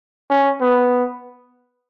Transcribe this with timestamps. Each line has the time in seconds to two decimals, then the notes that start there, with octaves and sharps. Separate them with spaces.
0.30 C#4
0.61 B3